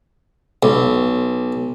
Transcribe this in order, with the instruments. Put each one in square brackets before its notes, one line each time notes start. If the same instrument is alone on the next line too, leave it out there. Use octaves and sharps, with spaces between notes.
[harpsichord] B1